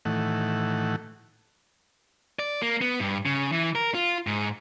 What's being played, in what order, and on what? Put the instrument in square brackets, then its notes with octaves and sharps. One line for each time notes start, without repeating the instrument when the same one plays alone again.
[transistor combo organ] A2 D#3 E3 A3 F#5
[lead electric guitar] D5
A#3
B3
G2
C#3
E3
A#4
F4
G#2